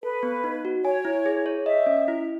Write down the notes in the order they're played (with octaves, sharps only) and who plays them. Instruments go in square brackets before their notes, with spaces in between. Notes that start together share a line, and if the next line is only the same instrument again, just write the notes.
[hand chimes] A4 [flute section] B4
[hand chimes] B3
D#4
F#4
[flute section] C#5 [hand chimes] G#5
[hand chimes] E4
G#4
C#5
[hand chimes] D#5 [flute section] E5
[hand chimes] C#4
E4